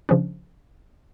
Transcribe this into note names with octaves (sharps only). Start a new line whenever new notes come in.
C#3 F3 C#4 D4